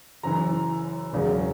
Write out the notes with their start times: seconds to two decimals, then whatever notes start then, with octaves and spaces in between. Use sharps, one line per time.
0.23 F#1 F#2 E3 A#5
1.12 E1 E2 C#3 F#3